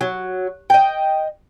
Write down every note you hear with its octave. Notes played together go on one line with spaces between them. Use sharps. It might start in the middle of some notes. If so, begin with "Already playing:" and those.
F#3
D#5 G5